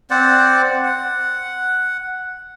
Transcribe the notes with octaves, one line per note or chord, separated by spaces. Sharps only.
C4 C5 D5 F#5
F#5